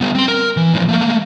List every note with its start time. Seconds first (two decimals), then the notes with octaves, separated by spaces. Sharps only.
0.01 G3 B3
0.15 C4 C6
0.28 A#4
0.57 E3
0.73 A2 F3
0.88 A3 A#3